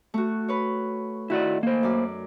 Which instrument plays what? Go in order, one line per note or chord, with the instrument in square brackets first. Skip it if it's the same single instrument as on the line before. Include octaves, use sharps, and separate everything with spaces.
[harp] A3 F#4
B4 C#5
[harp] D#3 [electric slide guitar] E4 F#4 D5
[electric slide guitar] A#3 C5
[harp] F#2 D5